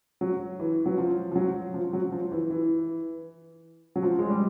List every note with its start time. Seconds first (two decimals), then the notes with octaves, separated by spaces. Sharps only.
0.21 F#3
0.60 E3
0.86 F#3
0.98 F3
1.32 F3
1.36 F#3
1.74 F3
1.93 F#3
2.12 F3
2.31 E3
2.51 E3
3.96 F#3
4.03 F3
4.19 G#3
4.30 G3